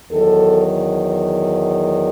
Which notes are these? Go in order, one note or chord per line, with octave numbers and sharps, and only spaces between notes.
E2 D#3 F#3 A4